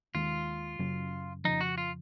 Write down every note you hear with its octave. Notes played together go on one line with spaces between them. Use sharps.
D#2 D#3 G#3 F4
F#2 C#3 F#3 C#4
F2 C#3 F3 D#4
F#4
F4